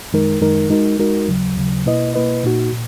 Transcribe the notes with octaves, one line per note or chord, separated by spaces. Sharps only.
F#2 D#3 G#3 D#4 A#4
F#2 D#3 G#3 D#4 A#4
G#3 D#4 F#4 A#4
G#3 D#4 F#4 A#4
D#2 C#3 F#3
D#2 C#3 F#3
B2 A#3 E4 B4 D#5
B2 A#3 E4 B4 D#5
A#2 A#3 D#4 F#4
A#2